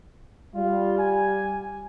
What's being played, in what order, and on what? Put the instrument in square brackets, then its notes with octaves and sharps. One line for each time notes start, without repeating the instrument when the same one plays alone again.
[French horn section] G3 [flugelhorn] F4
[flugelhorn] G#5